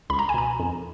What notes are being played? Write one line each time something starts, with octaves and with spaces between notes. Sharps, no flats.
C#2 B5
A#5
G#5
B2 A#5
F2